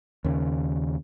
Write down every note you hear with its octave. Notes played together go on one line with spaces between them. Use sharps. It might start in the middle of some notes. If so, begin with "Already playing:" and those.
D#2 C#3